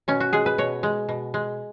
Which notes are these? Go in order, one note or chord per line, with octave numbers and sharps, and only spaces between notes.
B2 C#4
F#4
G#3 G#4
B4
B2 C#5
G#3
B2
G#3